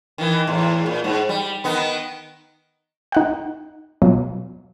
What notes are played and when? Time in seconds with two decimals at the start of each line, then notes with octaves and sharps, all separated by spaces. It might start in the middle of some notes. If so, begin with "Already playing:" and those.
0.18 D#3 E3
0.47 E2 A2
0.86 A#2
1.04 G#2
1.29 G3
1.64 D#3 B3 D#4
3.12 D#4 F#5 G5
4.02 B2 F#3 F4